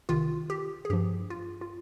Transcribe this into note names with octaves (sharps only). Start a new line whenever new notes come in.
C2 C3 D#3 F4
G4
G#4
G2 F3 G4
F4
F4